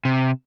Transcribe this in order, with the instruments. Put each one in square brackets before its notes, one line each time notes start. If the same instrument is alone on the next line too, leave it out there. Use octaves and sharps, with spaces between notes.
[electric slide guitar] C3